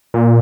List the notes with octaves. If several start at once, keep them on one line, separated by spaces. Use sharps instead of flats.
A#2